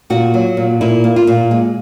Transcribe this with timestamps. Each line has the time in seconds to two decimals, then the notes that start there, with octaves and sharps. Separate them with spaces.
0.10 A#2 F#4
0.34 F#3
0.57 A#2
0.81 A#2 E4
1.04 A#3
1.16 F4
1.27 A#2
1.51 G#3